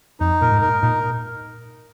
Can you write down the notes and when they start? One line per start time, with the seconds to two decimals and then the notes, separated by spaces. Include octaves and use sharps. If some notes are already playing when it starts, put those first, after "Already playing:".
0.20 F2 D#4
0.42 A#2 A#4
0.51 G#2
0.62 A#4
0.82 A#2 D#4